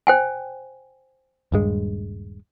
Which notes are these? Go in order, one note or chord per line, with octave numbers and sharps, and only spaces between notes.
C5 G5 G#5
D#1 G2 G#3